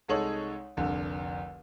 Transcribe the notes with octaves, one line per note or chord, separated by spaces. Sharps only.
C2 G#3 D#4 A4 C#5 F#7
F1 C2 D3